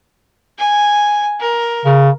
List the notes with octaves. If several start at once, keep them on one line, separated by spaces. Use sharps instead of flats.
G#5
A#4
C#3